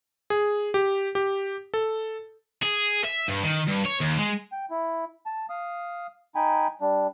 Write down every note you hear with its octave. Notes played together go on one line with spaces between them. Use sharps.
G#4
G4
G4
A4
G#4
E5
G2
D#3
G2
C#5
D#2
G#3
G5
E4
A5
F5 D#6
D#4 G5 G#5 B5
G3 D4